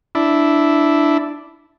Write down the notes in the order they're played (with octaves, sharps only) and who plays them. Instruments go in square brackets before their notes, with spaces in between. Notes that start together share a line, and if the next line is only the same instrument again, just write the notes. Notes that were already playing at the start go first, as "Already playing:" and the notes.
[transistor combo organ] D4 E4